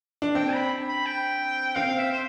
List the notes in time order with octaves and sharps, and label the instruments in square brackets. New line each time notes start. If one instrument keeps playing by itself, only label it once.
[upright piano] D4
[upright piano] C4 [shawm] G5
[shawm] B5
B5
G5
[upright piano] C4 [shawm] F5
[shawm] E5
C5